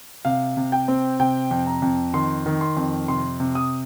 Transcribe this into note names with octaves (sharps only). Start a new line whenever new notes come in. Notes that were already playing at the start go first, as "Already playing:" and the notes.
C3 F5
C3
G5
C4
C3 G5
F2
A#5
F2
D#3 C6
D#3
C6
F2
C3 C6
C3
D#6